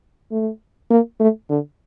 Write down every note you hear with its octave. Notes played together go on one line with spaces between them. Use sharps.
A3
A#3
A3
D3